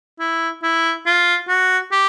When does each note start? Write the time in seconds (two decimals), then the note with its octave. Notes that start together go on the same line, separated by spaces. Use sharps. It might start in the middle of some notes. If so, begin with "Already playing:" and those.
0.19 E4
0.63 E4
1.06 F4
1.48 F#4
1.92 G4